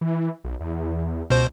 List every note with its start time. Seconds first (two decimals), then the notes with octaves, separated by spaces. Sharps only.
0.01 E3
0.44 B1
0.60 E2
1.30 C#2 B2 C5